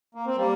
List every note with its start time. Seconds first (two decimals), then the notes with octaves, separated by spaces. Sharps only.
0.15 A#3
0.26 C4
0.36 G3 A#3